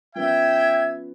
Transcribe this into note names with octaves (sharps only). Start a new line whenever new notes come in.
F3 B3 C#4 E5 G5 G#6